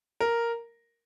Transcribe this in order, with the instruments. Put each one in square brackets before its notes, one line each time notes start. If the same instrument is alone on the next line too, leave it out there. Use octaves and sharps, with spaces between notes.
[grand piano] A#4